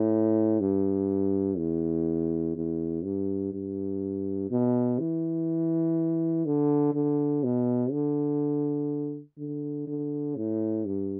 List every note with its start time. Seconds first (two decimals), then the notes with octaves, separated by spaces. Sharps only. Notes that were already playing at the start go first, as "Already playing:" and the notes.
Already playing: A2
0.60 G2
1.58 E2
2.56 E2
3.04 G2
3.53 G2
4.51 B2
4.99 E3
6.45 D3
6.94 D3
7.44 B2
7.91 D3
9.38 D3
9.87 D3
10.36 A2
10.85 G2